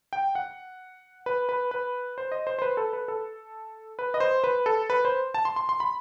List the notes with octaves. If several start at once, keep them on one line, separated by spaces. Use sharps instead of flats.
G5
F#5
B4
B4
B4
C5
D#5
C5
C5
B4
A4
B4
A4
B4
D#5
C5
B4
A4
B4
C5
A5
C6
C6
C6
B5